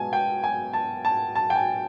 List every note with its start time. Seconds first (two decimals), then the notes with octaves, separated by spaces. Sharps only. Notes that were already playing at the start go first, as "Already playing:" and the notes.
Already playing: B2 G#3 B3 G#5 A5
0.13 G5
0.44 G#5
0.73 A5
1.05 A5
1.35 A5
1.50 G5
1.55 G#5